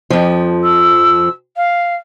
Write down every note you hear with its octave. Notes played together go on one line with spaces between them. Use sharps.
F2 F3
E6
F5